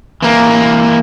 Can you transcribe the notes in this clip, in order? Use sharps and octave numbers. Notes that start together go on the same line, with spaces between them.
E3 A#3